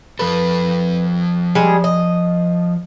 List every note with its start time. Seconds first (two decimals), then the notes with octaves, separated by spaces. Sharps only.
0.19 F3 A4 B4
1.55 G3 G#3 G#4
1.84 D#5